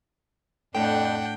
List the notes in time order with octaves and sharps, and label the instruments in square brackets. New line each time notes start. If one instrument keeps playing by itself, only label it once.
[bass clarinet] F2 [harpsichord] A2 [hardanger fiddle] D4 F#5 [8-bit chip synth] G5